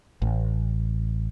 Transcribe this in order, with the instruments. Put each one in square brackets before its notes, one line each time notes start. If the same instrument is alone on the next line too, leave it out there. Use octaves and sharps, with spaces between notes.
[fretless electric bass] A1